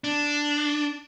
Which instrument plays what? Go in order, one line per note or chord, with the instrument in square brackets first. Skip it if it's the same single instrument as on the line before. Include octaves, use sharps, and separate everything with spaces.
[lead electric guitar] D4